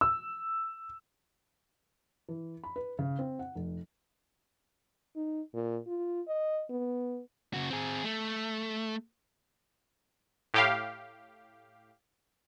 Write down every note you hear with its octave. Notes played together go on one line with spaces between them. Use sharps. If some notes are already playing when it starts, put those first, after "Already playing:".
E6
E3
B5
B4
C#3
C4
F#5
F1
D#4
A#2
F4
D#5
B3
C#3 F#4
C4 G#4
A3
A2 G4 F5